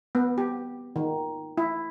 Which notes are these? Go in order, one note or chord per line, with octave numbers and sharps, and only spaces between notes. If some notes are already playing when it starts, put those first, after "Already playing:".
B3
G4
D#3
E4